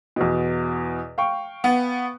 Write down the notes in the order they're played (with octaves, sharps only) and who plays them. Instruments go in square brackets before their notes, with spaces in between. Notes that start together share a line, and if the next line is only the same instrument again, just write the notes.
[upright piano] E2 B2
F5 G5 C#6
[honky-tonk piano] B3